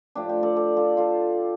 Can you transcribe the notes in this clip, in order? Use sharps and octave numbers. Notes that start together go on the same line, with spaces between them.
A2 F3 D4 G4
G4 C5
A4 D5
A4 D5
F4 A4
F4 A4